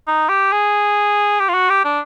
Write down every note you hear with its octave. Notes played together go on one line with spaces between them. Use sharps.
D#4
G4
G#4
G4
F4
F#4
G4
D4